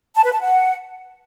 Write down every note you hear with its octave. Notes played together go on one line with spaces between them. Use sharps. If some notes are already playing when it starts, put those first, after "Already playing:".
A5
B4
A5
F#5